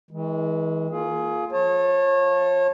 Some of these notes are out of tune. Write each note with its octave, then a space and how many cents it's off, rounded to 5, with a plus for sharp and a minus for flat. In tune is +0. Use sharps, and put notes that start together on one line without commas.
E3 -40 G#3 +0
A#3 +0 F4 +0 G#4 +20
F3 +0 C#5 -30 A5 +0